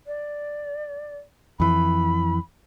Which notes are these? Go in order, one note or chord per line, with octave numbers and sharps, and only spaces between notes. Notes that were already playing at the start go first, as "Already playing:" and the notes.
D5
F2 E3 B5